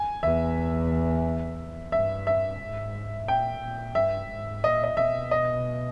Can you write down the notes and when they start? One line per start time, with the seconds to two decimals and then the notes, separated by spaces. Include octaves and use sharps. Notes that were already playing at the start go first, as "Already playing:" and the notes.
Already playing: G#5
0.23 E2 E5
1.92 G2 E5
2.27 E5
2.60 G#2
3.28 A#2 G5
3.62 A#2
3.95 G2 E5
4.30 G#2
4.63 A#2 D#5
4.84 D#5
4.97 B2 E5
5.31 D#5